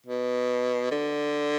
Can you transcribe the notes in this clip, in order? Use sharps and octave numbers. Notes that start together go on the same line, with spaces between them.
B2
D3